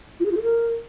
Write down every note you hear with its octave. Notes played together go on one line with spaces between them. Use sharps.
F4
G#4
F4
A4
A#4